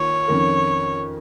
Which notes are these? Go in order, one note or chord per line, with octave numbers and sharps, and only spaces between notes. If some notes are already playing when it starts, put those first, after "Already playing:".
Already playing: D#3 A#3 F4 C#5
F2 D#3 C#4 A#4